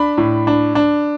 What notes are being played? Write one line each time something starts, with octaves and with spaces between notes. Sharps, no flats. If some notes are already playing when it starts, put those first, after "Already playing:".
Already playing: D4 B5
A2
D4
D4